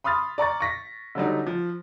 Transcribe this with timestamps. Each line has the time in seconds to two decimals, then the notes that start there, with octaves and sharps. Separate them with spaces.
0.04 B5 C6 D#6 F6 A6
0.38 D5 A#5 C#6 A6
0.60 C#6 A#6 B6
1.15 D3 F#3 G3 D#4
1.47 F3